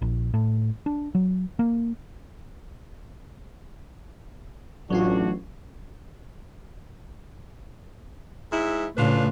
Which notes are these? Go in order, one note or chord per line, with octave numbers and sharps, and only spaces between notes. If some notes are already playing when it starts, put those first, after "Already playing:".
A#1
A2
D4
F#3
A#3
A1 F#3 C#4 D4 F4 F#4
G#2 E4
A2 C#3 D4 F4 B4